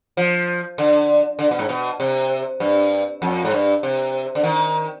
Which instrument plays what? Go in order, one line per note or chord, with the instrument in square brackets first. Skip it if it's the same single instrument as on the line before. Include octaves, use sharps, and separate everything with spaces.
[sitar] F3
D3
D3
B2
G#2
B2
C3
G2
F2
G#2
G2
C3
D3
D#3